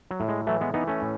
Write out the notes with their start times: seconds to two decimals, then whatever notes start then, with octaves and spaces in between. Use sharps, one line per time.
0.11 F#3
0.20 A2
0.28 G#3
0.47 E3 F#3 A3
0.61 G#3 B3
0.74 E3 B3 D#4
0.87 A3 C#4
1.02 A2